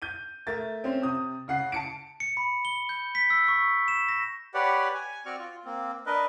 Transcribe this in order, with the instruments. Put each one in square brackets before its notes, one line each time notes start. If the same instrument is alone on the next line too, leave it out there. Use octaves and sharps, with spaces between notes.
[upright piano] G6 D#7
A3 A#4 E5 A6
C4 C#4 C5
C3 D#6
C#3 F#5 C7
A5 C#7 D7
[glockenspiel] C#7
B5
G7
G6
B6
E6
C#6
E7
A#6
[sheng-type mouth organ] G4 B4 C#5 D5 F#5
G#5
C4 F#4 D5 C#6 F6
F4
A#3 C4
D4 A#4 B4 D#5